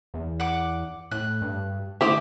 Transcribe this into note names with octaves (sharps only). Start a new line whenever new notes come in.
E2
F#5 D6
A2 F#6
G2
D3 A3 E4 G4 C5 D6 D#6